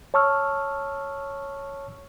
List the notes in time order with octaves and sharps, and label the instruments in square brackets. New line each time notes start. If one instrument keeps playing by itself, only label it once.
[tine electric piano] C#5 A5 C#6 E6 F6